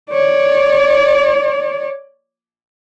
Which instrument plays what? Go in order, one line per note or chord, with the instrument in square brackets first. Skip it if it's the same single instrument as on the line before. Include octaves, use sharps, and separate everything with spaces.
[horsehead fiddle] C#5 D5